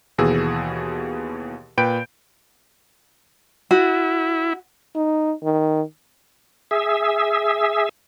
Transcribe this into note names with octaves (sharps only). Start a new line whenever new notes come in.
D#2 B2 E3 G#4 E6
A#2 B4 G5 B5 G6 D7
E4 F#4
D#4
D#3
G#4 E5